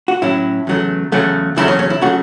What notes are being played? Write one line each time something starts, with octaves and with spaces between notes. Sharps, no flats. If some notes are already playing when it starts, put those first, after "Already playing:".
F#4
A2 F#3 C#4 E4
E2 C#3 F#3 A3
E2 C#3 F#3 A3
E2 C#3 F#3 A3 E4
C#4
C#4
E4
C#3 F#3 A3 F#4